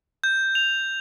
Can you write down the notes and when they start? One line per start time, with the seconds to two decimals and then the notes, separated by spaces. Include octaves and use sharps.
0.24 G6
0.55 F7